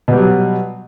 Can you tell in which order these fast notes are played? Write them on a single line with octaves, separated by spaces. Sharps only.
B2 G3 F#3